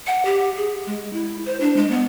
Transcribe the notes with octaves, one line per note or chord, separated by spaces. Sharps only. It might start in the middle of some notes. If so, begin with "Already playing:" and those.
F#5
G4
G#4
G#3
E4
C5
D4
G#3
B3